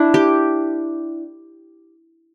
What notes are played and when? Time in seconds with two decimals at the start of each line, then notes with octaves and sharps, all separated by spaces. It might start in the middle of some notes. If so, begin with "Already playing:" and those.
Already playing: D4 E4
0.14 G4